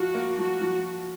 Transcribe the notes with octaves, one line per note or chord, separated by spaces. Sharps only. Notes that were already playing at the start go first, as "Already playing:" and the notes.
Already playing: F3 F4 F#4
A#3
F3 F#4
F3